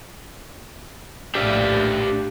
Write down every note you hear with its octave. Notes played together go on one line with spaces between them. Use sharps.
A#1 A2 D4 G4 D5 E5 F5